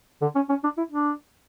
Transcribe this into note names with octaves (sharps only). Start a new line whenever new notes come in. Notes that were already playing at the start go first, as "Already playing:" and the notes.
D3
C#4
C#4
D4
E4
D4